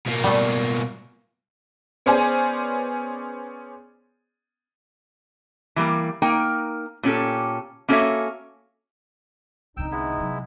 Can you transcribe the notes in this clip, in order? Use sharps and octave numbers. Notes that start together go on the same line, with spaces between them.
B2 A#3
G3 A3
B3 C#4 G#4 C5 D5 G#5
E3 G3 A#3
A#3 D#4 A#4 G5
A#2 C#4 G4 A4
A#3 C#4 F#4 A4 C#5 E5
C2 D3 D#4 G5 E6
G#3 B3 E4
C3 F#3